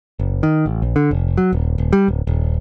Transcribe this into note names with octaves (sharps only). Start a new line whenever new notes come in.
F#1
D#3
A1
A#1
D3
F1
F#3
D#1
D#1
G3
D1
D#1